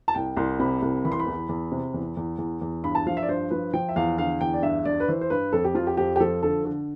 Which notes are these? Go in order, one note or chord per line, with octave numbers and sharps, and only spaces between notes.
A5
C2 G5
C2 C6
C3 B5
C2
E3 B5
C6
B5
E2
E2
C3
E2
E2
E2
E2
G2 B5
A5
F3 F5
E5
D5
G2 C5
F3 B4
F3 G5
E5
E2 F5
D3 F5
E2 G5
D5
G2 E5
G2 D5
B4
E3 C5
C5
G2 B4
F2 A4
G4
F3 F4
G4
F2 G4
G4
F3 A4
D3 A4
D3